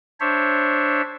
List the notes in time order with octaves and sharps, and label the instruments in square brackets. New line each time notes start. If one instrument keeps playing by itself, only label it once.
[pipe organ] D4 C5 C#5 E5